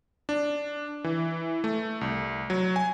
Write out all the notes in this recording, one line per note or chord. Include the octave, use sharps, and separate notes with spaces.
D4
E3
A3
C2
F#3
G#5